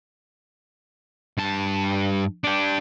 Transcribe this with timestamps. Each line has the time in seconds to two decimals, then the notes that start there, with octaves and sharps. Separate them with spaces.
1.38 G2 A5
2.44 D4 G4